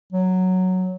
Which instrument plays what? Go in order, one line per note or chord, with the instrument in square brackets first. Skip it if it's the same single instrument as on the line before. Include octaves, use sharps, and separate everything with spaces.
[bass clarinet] F#3